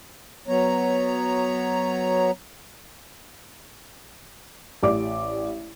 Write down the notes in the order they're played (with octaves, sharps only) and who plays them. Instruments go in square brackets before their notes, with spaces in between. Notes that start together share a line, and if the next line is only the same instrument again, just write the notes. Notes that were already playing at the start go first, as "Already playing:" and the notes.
[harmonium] F#3 B3 C#5 A#5
[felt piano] A1 G4 D5 D6